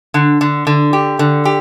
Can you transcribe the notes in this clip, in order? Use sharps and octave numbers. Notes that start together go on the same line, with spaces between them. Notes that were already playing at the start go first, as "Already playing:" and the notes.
D3
D3
D3
G4
D3
G4